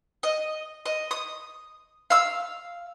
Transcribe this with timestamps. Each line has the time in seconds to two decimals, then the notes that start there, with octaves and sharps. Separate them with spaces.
0.23 D#5
0.86 D#5
1.11 D#6
2.10 F5 E6